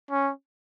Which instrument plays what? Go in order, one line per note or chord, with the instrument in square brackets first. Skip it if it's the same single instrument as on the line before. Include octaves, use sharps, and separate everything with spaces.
[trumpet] C#4